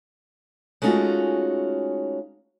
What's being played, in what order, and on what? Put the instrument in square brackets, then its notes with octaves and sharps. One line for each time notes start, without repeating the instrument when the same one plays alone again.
[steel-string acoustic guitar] G#3 A3 C#4 D#4 F4 F#4